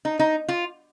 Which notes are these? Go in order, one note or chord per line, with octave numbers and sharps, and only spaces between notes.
D#4
D#4
F4